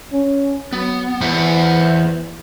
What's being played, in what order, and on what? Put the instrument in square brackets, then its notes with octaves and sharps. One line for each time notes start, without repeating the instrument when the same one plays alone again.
[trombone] C#4
[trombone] F#3 [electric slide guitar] B3
[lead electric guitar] E2 [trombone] E3 [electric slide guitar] C5 E5 F#5